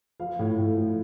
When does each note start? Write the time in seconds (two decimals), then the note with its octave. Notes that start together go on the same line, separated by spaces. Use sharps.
0.20 F3 F5
0.39 A2
0.58 A2
0.77 F3